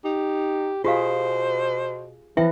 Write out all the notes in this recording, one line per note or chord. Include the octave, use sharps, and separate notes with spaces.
D#4 G4
B2 F4 G4 G#4 C5 F5
E3 F3 E4 B4 E5 G5